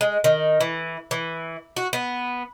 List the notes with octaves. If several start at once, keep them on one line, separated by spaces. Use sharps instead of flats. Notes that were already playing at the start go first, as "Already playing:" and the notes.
G#3
D#3
E3
E3
F#4
B3